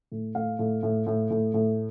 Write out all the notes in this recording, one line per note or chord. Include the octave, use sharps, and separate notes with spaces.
A2
A2 F5
A2
A2
A2
A2
A2